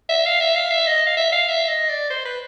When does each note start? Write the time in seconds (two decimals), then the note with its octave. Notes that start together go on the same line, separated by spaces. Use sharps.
0.09 E5
0.26 F5
0.40 E5
0.56 F5
0.71 E5
0.87 D#5
1.06 F5
1.17 E5
1.32 F5
1.48 E5
1.68 D#5
1.89 D5
2.10 C5
2.25 B4